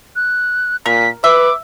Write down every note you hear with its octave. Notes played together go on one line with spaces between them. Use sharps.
F#6
A#2 A#4 B6
B4 E5 D6